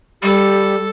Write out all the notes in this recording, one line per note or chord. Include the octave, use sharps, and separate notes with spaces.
G3 G4 A4